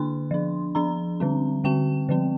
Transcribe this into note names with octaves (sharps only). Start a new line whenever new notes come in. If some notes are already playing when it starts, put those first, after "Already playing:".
Already playing: D3 A#3 D4 C6
F3 D4
F3 D4 A#5
D3 G3 C4
D3 G3 C4 G5
D3 F3 C4